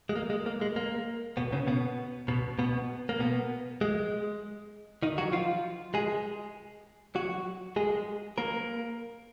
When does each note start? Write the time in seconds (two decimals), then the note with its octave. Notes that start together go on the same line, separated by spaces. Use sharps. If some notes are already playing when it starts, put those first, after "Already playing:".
0.09 G#3
0.15 A#3
0.30 G#3
0.46 A#3
0.61 G#3
0.76 A#3
1.37 B2 B3
1.52 C#3 C#4
1.67 B2 B3
2.28 B2 B3
2.59 B2 B3
3.09 A#3
3.20 B2 B3
3.81 G#3
5.03 D#3 D#4
5.18 F#3 F#4
5.32 F3 F4
5.94 G#3 G#4
7.15 F#3 F#4
7.76 G#3 G#4
8.38 A#3 A#4